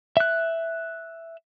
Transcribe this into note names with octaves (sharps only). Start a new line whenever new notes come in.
E5 F#6